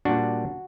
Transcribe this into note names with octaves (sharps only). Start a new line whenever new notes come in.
A#2 G3 A#3 D4 F#4